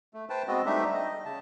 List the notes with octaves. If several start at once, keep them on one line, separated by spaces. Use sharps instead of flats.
A3
B4 C5 G5 A5
G#3 B3 C4 F#4 D#5
G3 A3 D4 D#4 G4 E5
D#5
C#3 A5